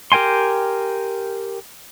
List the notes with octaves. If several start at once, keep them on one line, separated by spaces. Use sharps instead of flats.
G4 A#4 G5 G#5 C6